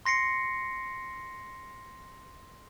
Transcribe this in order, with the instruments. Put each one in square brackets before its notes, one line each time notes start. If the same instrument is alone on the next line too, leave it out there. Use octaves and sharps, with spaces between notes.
[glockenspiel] C6 A#6 C7 C#7